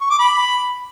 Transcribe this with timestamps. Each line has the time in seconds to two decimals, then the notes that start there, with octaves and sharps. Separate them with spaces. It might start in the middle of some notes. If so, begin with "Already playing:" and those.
0.01 C#6
0.10 D6
0.19 B5